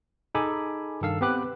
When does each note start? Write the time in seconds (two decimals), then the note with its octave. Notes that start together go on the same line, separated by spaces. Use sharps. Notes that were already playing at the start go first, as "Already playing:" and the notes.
0.35 D#4 G#4 A4 G#5 B5 D6
1.01 G2 D#3 A4 F5 E6
1.21 B3 C4 G4 B4 D6 F#6